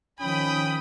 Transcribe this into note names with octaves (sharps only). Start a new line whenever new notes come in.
D#3 F3 C#4 G5 B5 D#6